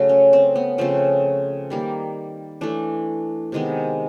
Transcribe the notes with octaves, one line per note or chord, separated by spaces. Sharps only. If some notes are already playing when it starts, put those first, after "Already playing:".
Already playing: C#3 F#3 A3
C#4
C4
B3
C#3 F3 A3 C4
D#3 G3 A#3
E3 A3 D4
C3 D#3 G#3 B3